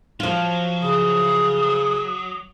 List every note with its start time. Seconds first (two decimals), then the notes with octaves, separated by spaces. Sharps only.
0.20 F3 F#3 F4
0.82 C#3 D#6